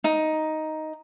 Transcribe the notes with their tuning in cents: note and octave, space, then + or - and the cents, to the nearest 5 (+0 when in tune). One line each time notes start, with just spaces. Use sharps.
D#4 +5